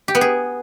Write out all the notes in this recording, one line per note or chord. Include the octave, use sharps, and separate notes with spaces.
G4
B3
G#4